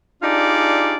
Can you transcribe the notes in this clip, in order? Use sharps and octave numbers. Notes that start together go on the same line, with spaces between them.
D4 D#4 F4 G4 G#4 D5